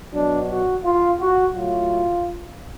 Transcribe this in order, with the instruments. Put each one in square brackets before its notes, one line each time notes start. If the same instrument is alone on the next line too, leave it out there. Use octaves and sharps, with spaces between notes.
[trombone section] B2 F#3 D4
F#4
F4
F#4
A2 F#3 F4